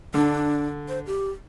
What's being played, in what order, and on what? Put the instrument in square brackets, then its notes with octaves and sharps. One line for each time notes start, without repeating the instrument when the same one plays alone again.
[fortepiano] D3 [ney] D4
[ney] C5
G4